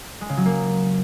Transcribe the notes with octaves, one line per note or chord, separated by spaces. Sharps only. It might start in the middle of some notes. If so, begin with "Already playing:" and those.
G#3
C#3
F#3
A#3